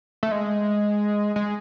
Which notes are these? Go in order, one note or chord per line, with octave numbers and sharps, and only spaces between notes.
A3
G#3
G#3